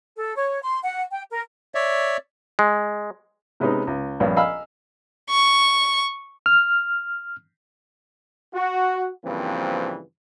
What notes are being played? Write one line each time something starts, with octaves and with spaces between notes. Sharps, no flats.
A4
C#5
C6
F#5
G5
A#4
C#5 D5 E5
G#3
C3 G#3 B3 C#4 D#4
C#2
A#1 G2 B3 C#4 F5
D#5 F5 G#5 B5 E6 F6
C#6
F6
F#4
G2 C#3 E3 F3 A#3 C4